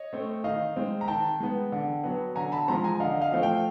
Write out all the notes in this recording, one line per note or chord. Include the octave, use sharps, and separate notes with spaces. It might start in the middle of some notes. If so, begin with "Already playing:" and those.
Already playing: C#5 D#5
A3 C4
D#3 D#5 F5
G#3 C4
A#5
D#3 G5 A5
G#3 B3
D3
F#3 B3
D3 G#5 A#5
A5 B5
F3 G#3 C4 A#5 C6
G#5 A#5
D3 D#5 F5
D#5 F5
F3 A3 C4
F5 G5